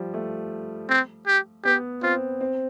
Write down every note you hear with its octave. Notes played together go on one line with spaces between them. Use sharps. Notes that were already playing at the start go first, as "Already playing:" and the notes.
Already playing: F3 G3
A3
C4
G4
B3 G4
C4 F4
C4